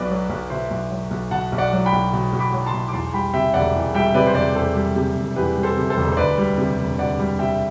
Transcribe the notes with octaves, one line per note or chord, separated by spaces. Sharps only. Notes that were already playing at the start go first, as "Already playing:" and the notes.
Already playing: B1 B2 B4 D5
F#3
B1
B2 C5 E5
B1
F#3
B1
B2 F#5 A5
B1
D5 F#5
F#3
G5 B5
B1
B2
B1
B5 D6
F#3
A5 C6
B1
D6
E2 A5 C6
G3 G5 B5
C3 E5 G5
E1 D5 F#5
E2
G3 E5 G5
C3 B4 D5
C5
E1 B4 D5
E2 A4 C5
G3
C3
E1
E2 G4 B4
G3
A4 C5
C3
A4 C5
E1
C5
D2 B4 D5
G3
C3
E1
D2 D5 F#5
G3
C3 E5 G5